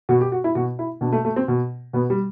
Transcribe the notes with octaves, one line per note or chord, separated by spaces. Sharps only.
B2 F#4
G4
F#4
E4
B2 F#4
E4
B2 D4
A3
A3
C4
B2
B2 B3
G3